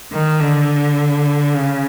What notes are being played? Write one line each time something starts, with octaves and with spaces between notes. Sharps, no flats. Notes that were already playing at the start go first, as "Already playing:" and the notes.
D#3
D3
C#3